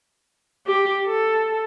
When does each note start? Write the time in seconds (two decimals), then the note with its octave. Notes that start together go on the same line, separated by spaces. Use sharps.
0.67 G4
1.06 A4